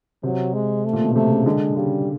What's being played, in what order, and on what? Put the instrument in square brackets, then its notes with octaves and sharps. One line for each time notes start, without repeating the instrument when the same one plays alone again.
[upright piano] C3 [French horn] F#3
[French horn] G#3
A3
[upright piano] A#2
B2
[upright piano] C3 [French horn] A3
[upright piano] C#3
[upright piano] D3 [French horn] G#3
[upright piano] C#3 [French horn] G3